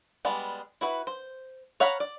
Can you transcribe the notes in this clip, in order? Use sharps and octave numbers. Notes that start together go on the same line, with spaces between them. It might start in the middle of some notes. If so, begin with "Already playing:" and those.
G3 G#3 B3 D5
E4 F#4 B4
C5
C#5 F5 F#5 A#5 B5
D5